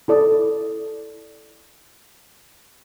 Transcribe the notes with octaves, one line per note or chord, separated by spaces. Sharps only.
E4 A4 D5 D#6